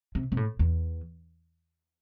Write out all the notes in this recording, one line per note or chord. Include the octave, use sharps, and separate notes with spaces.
C3
C3
A2
E2